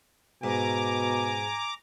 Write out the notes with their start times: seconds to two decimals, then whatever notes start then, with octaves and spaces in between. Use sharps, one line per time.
0.44 G#2 B2 G#5 A#5 D6